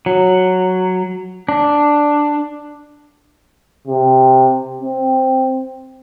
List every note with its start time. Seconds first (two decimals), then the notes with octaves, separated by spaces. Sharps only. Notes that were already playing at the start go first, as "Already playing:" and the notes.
0.06 F#3
1.49 D4
3.87 C3
4.82 C4